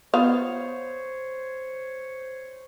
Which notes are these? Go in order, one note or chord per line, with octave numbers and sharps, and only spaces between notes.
B3 F4 C5 C#5 F5